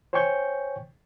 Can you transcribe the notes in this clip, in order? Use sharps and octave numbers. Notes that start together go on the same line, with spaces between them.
C5 C#5 G5 G#5 C#6 G6